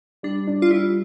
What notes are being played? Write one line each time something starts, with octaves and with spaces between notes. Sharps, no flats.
G3 D4
D4
F4
G3 E4